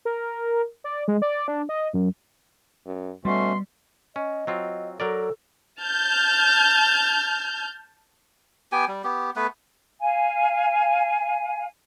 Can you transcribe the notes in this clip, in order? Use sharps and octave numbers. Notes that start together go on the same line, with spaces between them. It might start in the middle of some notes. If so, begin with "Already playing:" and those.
A#4
D5
G#3
D5
D4
D#5
F#2
F#2
B2 G3 A3 C#4 F#4 C6
C#4 D#5
F#3 C4 F4
F#3 A4 A#4 D5
A5 F6 G6
B3 G4 G5 G#5
G3
B3 G4
A3 B3 B4
F5 G#5